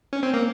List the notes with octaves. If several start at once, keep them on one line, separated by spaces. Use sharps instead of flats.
C#4
C4
A#3